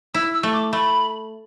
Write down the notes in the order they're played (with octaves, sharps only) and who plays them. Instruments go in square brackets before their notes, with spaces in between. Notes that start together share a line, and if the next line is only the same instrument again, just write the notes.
[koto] E4 [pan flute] E6
[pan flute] E6
[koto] A3
[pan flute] D6
[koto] A3 [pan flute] B5